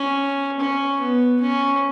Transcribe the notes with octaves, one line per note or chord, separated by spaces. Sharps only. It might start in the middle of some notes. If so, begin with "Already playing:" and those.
Already playing: C#4
C#4
B3
C#4